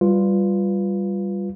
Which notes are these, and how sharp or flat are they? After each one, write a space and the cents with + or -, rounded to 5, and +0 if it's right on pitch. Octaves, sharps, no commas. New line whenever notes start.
G3 +0 F4 +0 B4 +0